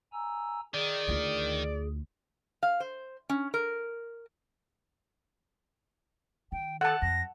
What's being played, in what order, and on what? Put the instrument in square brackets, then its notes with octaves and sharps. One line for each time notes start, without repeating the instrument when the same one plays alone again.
[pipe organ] G#5 A#5 E6
[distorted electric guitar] D#3 [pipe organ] G#4 [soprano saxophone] D5
[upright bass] D2 F4
[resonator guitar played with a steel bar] F5
C5
C#4
A#4
[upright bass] D#3 [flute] G5
[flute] A4 [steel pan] F#5 A5
[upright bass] F2 [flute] A#6